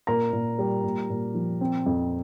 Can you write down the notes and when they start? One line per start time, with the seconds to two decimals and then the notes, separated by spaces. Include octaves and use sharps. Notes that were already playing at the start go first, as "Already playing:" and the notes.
0.07 A#2 A#4 A#5
0.33 A#2
0.58 G3
0.84 A#2
1.10 A#2
1.34 F3
1.61 C4
1.86 F2